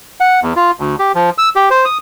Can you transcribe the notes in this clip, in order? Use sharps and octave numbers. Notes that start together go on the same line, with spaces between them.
F#5
E2
F4
D2
G4
F3
E6
G4
C5
D#6